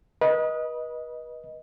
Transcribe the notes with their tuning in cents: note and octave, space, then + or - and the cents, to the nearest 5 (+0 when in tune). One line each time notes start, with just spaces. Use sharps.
B4 -35 D#5 +5